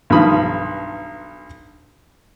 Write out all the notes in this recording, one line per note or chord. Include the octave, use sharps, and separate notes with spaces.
B1 G2 D#3 F3 B5 D#6